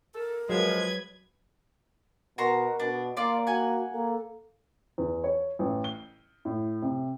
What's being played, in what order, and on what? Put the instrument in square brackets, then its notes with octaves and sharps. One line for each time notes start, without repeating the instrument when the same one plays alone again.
[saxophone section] A4 [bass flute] A#4
[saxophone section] F3 G#3 [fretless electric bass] F#3 [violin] B4 G#6
[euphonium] B2 [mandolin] F#4 A#5 C6 [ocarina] A#4
[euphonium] B2 [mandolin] D4
[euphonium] A#3 [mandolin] F4 D5 C6 [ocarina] F5
[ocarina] F#4 [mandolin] F#5 G#5
[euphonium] A#3 [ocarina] A4
[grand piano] E2
C#5
A1
G7
A2
C3